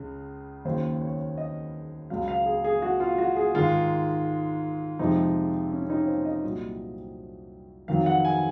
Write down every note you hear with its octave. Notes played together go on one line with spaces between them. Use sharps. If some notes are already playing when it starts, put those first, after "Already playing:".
Already playing: C#2 C#3
D#2 C#3 F#3 C5
C#5
D#5
C#2 C#3 F#3 F5
F5
G#4
G#4
F#4
F4
F#4
G#4
G#2 D#3 G#3 F4
F2 C3 F3 G#3 D#4
C#4
C#4
D#4
C5
D#5
C2 A#2 F#3
F2 D#3 F#3 F5
F#5
G#5